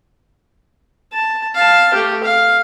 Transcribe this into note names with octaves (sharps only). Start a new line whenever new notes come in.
A5
F5 A5
A3 G4
F5